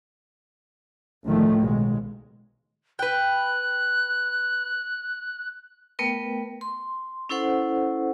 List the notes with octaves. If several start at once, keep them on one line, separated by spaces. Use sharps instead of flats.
D2 A2 D#3 F3 A3
B1 G#3
B4 G5 F#6
A3 B3 A#4 B4 G5
C6
C#4 E4 A4 C5 F#5